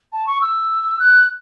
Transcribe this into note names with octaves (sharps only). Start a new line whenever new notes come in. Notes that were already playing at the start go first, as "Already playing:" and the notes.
A5
C#6
E6
F#6